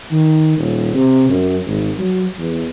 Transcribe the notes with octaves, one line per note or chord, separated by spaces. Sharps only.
D#3
D#1
C3
F#2
G#1
F#3
E2